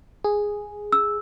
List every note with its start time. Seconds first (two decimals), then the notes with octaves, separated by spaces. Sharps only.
0.24 G#4
0.92 E6